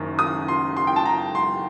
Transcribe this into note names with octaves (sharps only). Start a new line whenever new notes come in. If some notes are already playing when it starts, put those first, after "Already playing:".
Already playing: F#1 F#2 D#3
D#6
C6
C6
G5
A5
A#5
C6